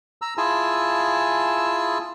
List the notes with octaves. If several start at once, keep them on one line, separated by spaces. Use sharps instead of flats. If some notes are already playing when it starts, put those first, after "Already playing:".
A#5 E6
E4 F4 G#4 G#5 A5 E6